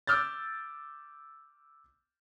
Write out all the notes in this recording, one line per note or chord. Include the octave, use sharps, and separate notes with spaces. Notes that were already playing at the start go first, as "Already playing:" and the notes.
D6 E6 F6 G6 A6